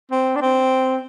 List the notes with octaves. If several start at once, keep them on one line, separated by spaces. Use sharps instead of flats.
C4
D4
C4